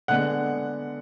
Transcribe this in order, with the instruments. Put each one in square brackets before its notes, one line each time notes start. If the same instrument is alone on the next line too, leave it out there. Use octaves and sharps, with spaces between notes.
[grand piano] D3 G#3 B3 F#5 F#6